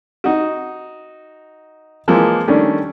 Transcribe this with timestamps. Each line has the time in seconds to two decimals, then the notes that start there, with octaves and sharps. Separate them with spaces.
0.24 D#4 F#4
2.08 E3 F3 G#3 A#3
2.48 D#3 G3 A3 C#4 D4